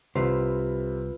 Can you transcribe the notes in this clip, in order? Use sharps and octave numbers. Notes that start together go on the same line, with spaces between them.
C2 C3 F4 B4 C5